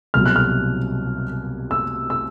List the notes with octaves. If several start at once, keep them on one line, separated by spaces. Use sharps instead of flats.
C2 B2 F#3 F6
F#6
F6
E6
E6